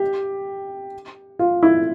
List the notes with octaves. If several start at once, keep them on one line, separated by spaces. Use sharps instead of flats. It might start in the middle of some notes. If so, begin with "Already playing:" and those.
Already playing: G4
F4
E4